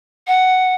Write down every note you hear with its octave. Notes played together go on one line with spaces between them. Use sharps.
F#5